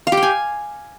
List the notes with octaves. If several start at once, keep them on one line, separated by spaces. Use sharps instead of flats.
F5
G4
G5
G#5